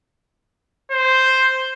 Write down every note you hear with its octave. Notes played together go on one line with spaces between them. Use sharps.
C5